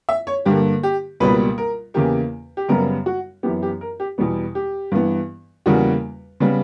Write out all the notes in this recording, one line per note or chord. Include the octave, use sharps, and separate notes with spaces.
E5
C#5
G2 D3 A#3 G4
G4
C#2 B2 G3 A#3 B4
A#4
E2 C#3 E3 A#3 G4
G4
F#2 C#3 G3 B3 A#4
F#4
F#2 E3 B3 G4
G4
A#4
G4
E2 B2 G3 B3
G4
G2 E3 B3
E2 C#3 G3 A#3 F#4
C#3 G3 B3